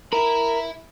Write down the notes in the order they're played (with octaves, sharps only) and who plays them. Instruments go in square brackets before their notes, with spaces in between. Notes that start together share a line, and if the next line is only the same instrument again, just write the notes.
[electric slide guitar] A#4 [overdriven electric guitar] E5 B5